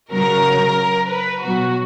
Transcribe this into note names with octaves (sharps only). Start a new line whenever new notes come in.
C#3 F#3 A#4
B4
B2 F#3 F#4